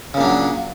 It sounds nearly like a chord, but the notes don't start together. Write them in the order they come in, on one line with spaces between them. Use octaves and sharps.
C#3 A#2 D4 F#3